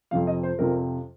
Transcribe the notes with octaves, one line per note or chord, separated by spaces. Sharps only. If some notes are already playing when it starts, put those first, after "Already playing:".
F2 C3 F3 F5
D#5
C5
F2 C3 F3 A#4